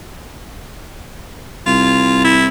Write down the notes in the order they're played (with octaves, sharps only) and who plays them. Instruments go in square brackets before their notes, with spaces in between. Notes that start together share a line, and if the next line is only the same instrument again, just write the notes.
[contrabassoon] C2 [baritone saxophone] F4
[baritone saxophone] E4